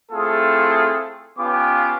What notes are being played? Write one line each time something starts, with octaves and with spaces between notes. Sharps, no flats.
A3 C4 E4 F4 G#4 A4
B3 C#4 F4 G4 D6